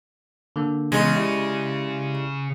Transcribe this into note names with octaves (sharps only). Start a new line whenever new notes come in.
D3 A#3
C#3 E3 G#3 B3 C#4
E4 G4 D5